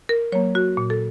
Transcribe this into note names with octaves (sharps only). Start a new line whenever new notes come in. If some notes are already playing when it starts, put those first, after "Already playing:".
A#4
F#3 A#3 C#5
F#4
A#2
A4